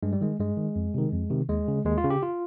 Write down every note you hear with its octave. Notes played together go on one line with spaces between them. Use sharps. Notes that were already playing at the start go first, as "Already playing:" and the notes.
G2 G#3
G3
D#3 G#3
G2 G#3
D#3
F2
C3 D#3
F2
C3 D#3
D#2 G#3
C#3
D#2 G#3
F4
C#3
G4
F4